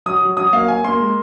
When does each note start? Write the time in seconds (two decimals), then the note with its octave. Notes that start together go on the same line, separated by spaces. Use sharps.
0.06 F#3 D#6
0.21 F#3
0.37 F#3 D#6
0.53 A#3 F5
0.68 A#3 G#5
0.84 A#3 C6
1.00 G#3